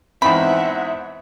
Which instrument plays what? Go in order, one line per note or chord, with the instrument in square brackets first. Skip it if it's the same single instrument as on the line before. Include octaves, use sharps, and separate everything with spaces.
[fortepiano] E2 G#2 C4 [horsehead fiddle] E5 F#5 [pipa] B5